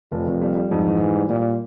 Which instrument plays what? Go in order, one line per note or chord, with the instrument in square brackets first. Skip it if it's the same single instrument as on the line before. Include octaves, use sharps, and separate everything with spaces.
[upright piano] F1 [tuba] F2
[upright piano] F1
G3
G3
[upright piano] F2 [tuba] G#2
[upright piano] E3
E3
G3
[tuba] A#2 [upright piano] G3